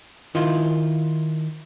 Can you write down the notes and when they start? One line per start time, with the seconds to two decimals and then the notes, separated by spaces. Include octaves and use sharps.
0.35 D#3 E4 F4